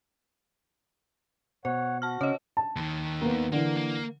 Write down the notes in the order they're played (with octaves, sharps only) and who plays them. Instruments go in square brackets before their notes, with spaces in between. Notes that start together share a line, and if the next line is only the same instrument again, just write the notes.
[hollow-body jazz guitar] B2 [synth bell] C5 [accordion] C#5 F#5
[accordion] F#4 [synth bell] A5 F6
[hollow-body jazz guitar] C#3 C#4 [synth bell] C#5 D#5
[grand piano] A5
[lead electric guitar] D#2 D#3
[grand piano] A#3 B3
[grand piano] D3 E3 [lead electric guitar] A#3
[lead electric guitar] A#3